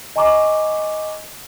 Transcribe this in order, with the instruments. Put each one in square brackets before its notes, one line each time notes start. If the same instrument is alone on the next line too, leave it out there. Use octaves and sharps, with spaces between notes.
[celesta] D#5 G#5 A#5 C#6 D6